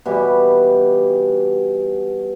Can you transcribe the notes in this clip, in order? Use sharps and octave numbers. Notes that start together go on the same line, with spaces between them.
B2 E3 G3 G4